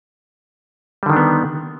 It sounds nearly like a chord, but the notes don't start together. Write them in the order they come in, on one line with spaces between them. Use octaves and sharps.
G3 D3 D#3 D4 B3